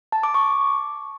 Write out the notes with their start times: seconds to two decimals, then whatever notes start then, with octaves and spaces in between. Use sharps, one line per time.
0.12 A5
0.23 D6
0.34 C#6